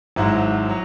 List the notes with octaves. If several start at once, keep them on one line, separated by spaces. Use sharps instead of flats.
G#1 G#2 F#3 E4
F#3